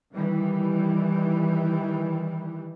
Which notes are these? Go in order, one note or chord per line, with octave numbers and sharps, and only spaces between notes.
D#3 E3 G3